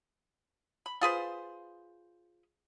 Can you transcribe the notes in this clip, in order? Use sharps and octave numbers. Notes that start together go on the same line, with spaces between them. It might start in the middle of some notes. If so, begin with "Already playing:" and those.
B5
F4 G#4 B4 C5